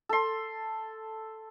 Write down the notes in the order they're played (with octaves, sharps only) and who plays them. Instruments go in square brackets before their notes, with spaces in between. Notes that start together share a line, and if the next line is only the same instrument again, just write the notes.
[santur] A4 C6